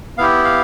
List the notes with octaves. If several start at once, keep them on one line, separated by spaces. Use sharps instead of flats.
B3 E4 G4 F5
F5